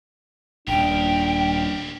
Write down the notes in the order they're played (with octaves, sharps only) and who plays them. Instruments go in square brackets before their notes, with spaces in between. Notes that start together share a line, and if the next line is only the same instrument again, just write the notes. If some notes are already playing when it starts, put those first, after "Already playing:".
[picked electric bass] D#1 G#1 [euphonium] D4 [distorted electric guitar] G4 A#4 [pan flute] G5